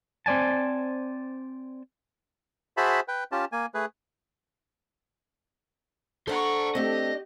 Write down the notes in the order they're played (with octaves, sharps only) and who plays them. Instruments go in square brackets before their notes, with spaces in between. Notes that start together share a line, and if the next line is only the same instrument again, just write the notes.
[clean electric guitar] C4 C5 D5 G#5 A5
[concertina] F#4 G#4 C5 E5 A5 B5
B4 G5
C#4 F4 G4 A5
A#3 G#5
A3 G#4 B4
[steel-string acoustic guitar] D4 A4 [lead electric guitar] C5 A#5 [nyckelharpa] F#5 C#6
[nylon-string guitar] A3 C4 [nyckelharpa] G4 [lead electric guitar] D#5